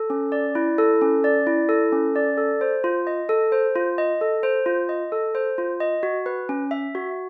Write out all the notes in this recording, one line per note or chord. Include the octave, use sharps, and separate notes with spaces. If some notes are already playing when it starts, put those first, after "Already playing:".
Already playing: A4
C#4
D5
E4
A4
C#4
D5
E4
A4
C#4
D5
A4
C5
F4
D#5
A4
C5
F4
D#5
A4
C5
F4
D#5
A4
C5
F4
D#5
F#4
B4
C#4
E5
F#4